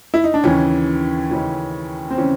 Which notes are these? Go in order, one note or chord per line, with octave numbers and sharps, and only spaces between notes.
E4
D#4
D4
D#2 C#3 E3 C#4
D#2 C#3 E3
C4
C#3 E3 C#4